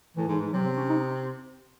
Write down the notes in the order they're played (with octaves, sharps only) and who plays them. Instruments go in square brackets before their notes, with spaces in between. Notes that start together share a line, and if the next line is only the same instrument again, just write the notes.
[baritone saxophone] A2 [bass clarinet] E3
[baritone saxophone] G#2
G#2
[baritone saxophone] C3 [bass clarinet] F#3
[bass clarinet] C4
C#4
D#4